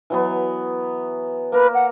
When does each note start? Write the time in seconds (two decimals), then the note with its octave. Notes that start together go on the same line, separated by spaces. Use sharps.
0.10 E3 F#3 B3
1.52 A#3 A#4 B4
1.74 F#5